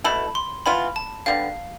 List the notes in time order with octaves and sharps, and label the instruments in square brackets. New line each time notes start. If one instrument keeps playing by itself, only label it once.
[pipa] B2 A3 E4 A4 [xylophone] B5
[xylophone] C6
[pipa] E3 B3 F4 [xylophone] B5
[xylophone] A5
[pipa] D3 G3 B3 [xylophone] F5